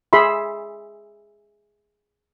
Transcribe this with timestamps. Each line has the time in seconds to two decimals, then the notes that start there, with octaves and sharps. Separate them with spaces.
0.13 G#4 E5 B5 C6